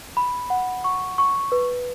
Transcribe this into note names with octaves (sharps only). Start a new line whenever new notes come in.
B5
F#5
C#6
C#6
B4